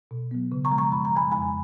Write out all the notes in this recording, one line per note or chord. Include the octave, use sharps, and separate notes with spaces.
B2
F#3 B3
C#3
A#5 C#6
F3 G#3
A#5 C#6
F#2 B5
A#5
F3 G#3 G#5 B5
F2 G#5 B5